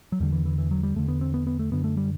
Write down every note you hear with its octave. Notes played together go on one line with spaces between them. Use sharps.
F#3
E2 D3 G3
E3
E3
E3
F#3
G3
E2 D3 A3
B3
C4
B3
B3
A3
F#2 D3 B3
A3
G3